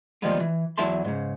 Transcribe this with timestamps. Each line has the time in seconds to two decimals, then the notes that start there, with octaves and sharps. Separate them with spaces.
0.22 D#3 F3 G3 G#3 A#3 B3
0.40 E3
0.78 E2 F#3 E4 E5 A5 C6
1.05 G#2 C#3